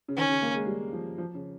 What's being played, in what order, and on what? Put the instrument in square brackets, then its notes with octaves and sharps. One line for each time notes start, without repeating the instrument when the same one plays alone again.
[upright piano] C#3
[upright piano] D#3 [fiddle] C#4
[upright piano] C#3
A#3
G#3
G3
F3
F3
C#3